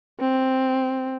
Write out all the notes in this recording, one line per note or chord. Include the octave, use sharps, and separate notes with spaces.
C4